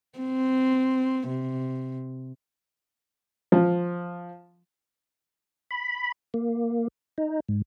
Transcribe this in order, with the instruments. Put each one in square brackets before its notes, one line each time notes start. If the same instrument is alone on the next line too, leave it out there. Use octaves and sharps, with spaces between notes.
[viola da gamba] C4
C3
[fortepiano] F3
[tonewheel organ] B5
A#3
D#4
G#2